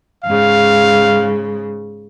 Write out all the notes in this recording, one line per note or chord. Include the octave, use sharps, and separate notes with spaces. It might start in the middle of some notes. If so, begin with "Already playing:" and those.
G#2 C#3 F5